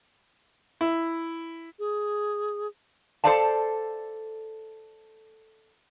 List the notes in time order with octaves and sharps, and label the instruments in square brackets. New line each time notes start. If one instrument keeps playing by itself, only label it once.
[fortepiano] E4
[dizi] G#4
[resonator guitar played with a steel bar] A4 A#4 C5 D5 F5 A5